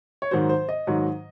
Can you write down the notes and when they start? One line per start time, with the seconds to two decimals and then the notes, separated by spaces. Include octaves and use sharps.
0.22 C#5
0.31 G#2 D#3 F#3 C5
0.49 C5
0.69 D#5
0.87 G#2 D#3 F#3